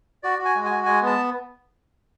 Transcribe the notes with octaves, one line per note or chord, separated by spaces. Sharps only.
F#4 D5
F#4
G#5
G#3
G#5
F#4
G#3 G#5
B3
A5